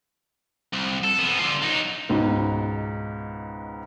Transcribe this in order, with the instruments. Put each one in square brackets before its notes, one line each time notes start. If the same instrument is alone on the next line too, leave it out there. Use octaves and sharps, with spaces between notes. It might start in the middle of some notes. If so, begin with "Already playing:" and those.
[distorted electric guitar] C2
A4
F3 B3
D3 F4
F#3 D#4
[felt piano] C#2 G#2 B2